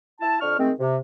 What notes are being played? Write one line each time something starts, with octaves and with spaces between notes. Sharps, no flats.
E4 A5
F2 D4 C#6 F6
D#3 G#3 A3 C4
C3